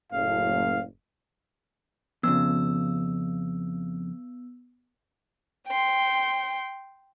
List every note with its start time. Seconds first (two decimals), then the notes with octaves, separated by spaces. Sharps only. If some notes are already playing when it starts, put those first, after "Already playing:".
0.12 F#1 A2 F5
2.23 F2 A2 C#3 B3 E6
5.68 G5 C6